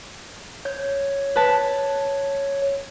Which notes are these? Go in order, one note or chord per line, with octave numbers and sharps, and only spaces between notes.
C#5 G6
B4 A5 F#6